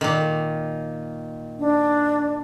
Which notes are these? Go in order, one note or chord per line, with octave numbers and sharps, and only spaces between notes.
A#2 D#3
D4